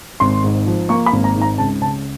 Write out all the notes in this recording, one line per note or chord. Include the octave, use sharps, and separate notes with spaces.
G#1 C6
G#2
F3
A#3 C#6
B5
G#1
A#5
G#2
A#5
C#2 A5
C#3 A5